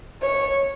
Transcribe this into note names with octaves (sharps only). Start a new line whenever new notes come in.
C#5